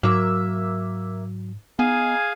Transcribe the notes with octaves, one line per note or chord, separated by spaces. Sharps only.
G#2 F#3 A#3 E5
B3 D#4 G#4 F5 G#5